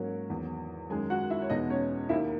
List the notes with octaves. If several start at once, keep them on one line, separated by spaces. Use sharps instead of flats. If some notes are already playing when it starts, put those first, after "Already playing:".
Already playing: G#2 F#3 A#3 C#4 A#4
E2 D#3 F#3
F#2 D#3 G#3 G#4 G#5
F#4 F#5
E4 E5
C#5
E2 B2 G#3 D#4 D#5
C#4 C#5
D#2 D#3 A#3 E4 E5